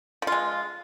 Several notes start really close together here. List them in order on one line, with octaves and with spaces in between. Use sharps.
F3 F4 G#3